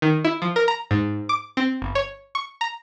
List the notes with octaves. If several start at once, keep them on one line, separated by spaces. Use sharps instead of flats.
D#3
E4
F3
A#4
A#5
G#2
D6
C4
G1
C#5
C#6
A#5